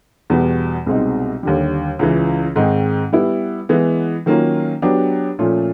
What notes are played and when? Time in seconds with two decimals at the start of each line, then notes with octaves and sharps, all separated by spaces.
0.30 E2 B2 G3 B3
0.86 C2 B2 G#3 C4 D#4
1.43 D#2 D3 G3
1.99 C#2 C#3 E3
2.56 G#2 D#3 G#3 C4 D#4
3.13 G3 B3 E4
3.69 E3 G#3 B3
4.26 D#3 F#3 A#3 C#4 F4
4.82 F#3 B3 D4 G4
5.39 A#2 F3 A3 C#4 F4